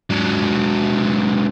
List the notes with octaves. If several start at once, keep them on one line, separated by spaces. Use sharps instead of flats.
G#2 F#3